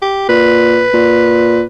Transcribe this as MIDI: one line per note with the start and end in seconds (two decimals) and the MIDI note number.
0.02 0.24 67
0.29 0.85 46
0.29 1.63 71
0.93 1.62 46